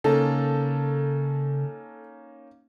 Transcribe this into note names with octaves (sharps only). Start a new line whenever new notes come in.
C#3 A#3 C#4 D#4 A4